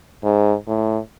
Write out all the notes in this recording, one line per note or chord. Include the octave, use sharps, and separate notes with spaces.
G#2
A2